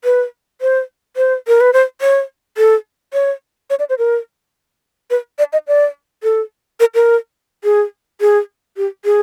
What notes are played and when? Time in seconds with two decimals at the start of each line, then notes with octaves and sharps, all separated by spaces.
0.04 B4
0.61 C5
1.17 C5
1.47 A#4
1.61 B4
1.73 C5
2.01 C#5
2.58 A4
3.14 C#5
3.70 C#5
3.79 D5
3.89 C5
3.98 A#4
5.10 B4
5.39 D5
5.53 D#5
5.68 D5
6.23 A4
6.80 A#4
6.94 A#4
7.64 G#4
8.21 G#4
8.77 G4
9.05 G#4